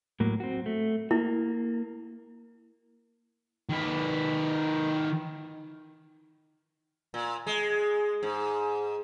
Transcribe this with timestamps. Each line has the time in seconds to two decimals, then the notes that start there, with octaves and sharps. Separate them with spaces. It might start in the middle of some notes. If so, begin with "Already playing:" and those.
0.20 A2 F#3 A#3
0.40 C4 F#4
0.66 A3
1.11 A#3 E4
3.69 D#3 B4
7.14 A#2
7.47 G#3
8.23 G#2